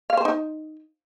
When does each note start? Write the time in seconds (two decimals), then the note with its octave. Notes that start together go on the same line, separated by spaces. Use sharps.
0.10 F5
0.17 C5
0.25 D#4